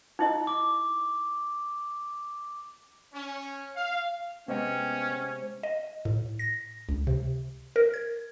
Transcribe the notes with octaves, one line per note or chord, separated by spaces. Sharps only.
D#4 E4 D#5
D6
C#4
F5
C3 G#3 B3 C#4 D#5 G5
D#5
A2
A#6
C#2
C3
A#4
G#6